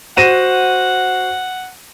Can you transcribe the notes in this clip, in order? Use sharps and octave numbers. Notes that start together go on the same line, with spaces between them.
F#4 C5 F#5 A#6 D#7 E7